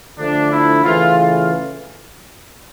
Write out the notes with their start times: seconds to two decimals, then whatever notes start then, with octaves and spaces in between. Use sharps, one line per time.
0.17 D3 F3 A3 D4
0.51 E4
0.84 C#3 E3 A3 F4
1.17 F4